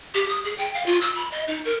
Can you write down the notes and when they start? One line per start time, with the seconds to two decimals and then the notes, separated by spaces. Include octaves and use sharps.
0.14 G4
0.28 D#6
0.44 G#4
0.58 G5
0.74 F5
0.86 F4
1.01 E6
1.15 B5
1.31 D#5
1.48 D#4
1.65 A#4